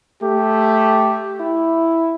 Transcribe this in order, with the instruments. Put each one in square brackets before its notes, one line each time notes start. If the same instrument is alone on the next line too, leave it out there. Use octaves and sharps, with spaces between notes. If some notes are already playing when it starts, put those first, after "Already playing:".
[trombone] A3 [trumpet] G4
[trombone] E4